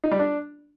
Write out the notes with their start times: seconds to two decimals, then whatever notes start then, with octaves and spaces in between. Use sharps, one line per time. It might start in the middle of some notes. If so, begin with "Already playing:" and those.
0.04 D#4
0.11 G3
0.19 D4